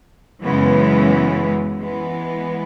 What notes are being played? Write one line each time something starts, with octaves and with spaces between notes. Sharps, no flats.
F#2 C#3 E3 G#3 B3
E3 G#3 B3